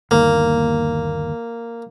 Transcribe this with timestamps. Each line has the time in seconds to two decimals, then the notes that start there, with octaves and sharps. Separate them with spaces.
0.11 G1 D#2 A#3